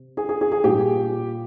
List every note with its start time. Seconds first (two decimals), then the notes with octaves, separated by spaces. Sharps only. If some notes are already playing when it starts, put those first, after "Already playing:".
Already playing: C3
0.17 G#4
0.29 G#4
0.41 G#4
0.52 G#4
0.64 A#2 G3 G4